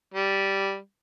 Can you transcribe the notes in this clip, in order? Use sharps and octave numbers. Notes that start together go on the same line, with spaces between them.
G3